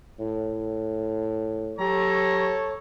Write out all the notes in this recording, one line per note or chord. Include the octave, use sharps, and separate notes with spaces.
A2
F#3 G4 A4 C#5 A#5